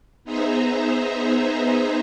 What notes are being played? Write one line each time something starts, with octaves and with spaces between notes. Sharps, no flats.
B3 D#4 G#4 C5 E5 A#5